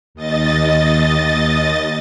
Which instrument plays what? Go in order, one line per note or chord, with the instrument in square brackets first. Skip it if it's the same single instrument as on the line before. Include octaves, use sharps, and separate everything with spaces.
[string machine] D#2 D#5 A6